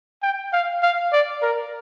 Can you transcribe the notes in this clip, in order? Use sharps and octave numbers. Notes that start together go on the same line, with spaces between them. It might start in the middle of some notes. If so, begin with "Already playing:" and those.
G5
F5
F5
D5
A#4